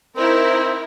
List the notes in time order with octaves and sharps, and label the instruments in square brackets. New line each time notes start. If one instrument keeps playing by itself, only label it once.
[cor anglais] C4 [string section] D#4 E4 A#4 [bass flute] C5